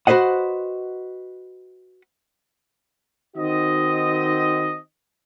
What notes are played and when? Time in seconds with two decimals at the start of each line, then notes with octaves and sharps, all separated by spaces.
0.07 F#4 B4 C5 D#5 F#5
3.37 D#3 C4 D#4 F#4 D#5